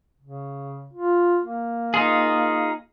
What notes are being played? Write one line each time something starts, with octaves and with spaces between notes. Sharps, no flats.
C#3
F4
A#3
D#4 F4 G#4